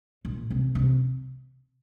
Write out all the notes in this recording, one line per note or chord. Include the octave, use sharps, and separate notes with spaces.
A#2
C3
C3